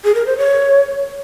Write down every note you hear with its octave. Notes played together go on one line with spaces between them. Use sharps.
G#4
A#4
C5
C#5